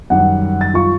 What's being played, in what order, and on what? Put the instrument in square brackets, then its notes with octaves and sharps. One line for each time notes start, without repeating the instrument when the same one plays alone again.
[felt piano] F#2 D#3 G3 [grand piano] F#5
[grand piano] A6
F4 C#6